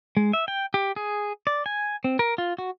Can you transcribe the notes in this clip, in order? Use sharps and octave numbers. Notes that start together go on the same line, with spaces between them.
G#3
E5
G5
G4
G#4
D5
G#5
C4
A#4
F4
F#4